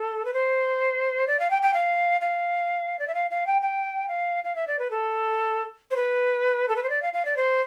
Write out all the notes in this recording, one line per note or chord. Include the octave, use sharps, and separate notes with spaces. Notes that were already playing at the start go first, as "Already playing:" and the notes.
Already playing: A4
B4
C5
D5
F5
G5
G5
F5
F5
D5
E5
F5
F5
G5
G5
F5
F5
E5
D5
B4
A4
C5
B4
A4
B4
C5
D5
F5
F5
D5
C5